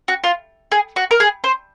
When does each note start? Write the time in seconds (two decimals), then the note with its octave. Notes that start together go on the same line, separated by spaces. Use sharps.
0.08 F#4
0.24 F4
0.72 G#4
0.96 F#4
1.11 A#4
1.20 G#4
1.44 C5